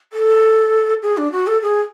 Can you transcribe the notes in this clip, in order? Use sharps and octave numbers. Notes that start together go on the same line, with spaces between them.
A4
G#4
D4
F#4
A4
G#4